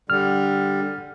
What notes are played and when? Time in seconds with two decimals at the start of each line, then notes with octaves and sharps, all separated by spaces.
0.10 D3 G3 F6